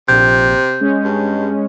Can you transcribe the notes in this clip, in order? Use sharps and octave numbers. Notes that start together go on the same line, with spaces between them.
A#1 C3 G6
G#3 C#4
G2